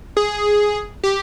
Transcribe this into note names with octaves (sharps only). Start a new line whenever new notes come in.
G#4
G4